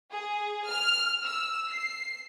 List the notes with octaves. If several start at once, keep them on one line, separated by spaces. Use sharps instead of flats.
G#4
F6
E6
C7